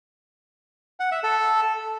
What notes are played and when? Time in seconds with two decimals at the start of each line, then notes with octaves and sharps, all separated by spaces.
1.00 F#5
1.12 E5
1.23 A4